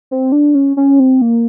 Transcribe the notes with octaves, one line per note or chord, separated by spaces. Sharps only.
C4
D4
C#4
C#4
C4
A#3